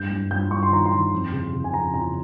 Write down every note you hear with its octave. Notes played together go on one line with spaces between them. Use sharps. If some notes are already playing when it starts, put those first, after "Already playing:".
Already playing: G2 G6
G2
G2 G6
G2 C#6
C6
D#3 A#5
C6
D#3
F2
C#3
C#3
G#5
F2 A#5
C#3 A#5